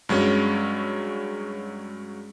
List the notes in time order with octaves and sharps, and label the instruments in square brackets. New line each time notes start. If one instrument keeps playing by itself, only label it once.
[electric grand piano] G2 F#3 G#3 C#4